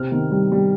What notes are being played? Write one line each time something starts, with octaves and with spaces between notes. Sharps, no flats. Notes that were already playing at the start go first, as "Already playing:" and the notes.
Already playing: C3 F6
D#3
G3
G3